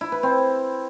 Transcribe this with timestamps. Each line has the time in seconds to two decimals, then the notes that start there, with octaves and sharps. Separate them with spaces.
0.01 E4
0.12 B4
0.23 C4